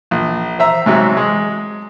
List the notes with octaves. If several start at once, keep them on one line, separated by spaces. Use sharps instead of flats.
A#1
C5 E5 A#5
G#2 C3 F#3
G#3